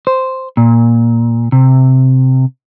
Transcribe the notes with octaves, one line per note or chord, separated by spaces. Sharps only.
C5
A#2
C3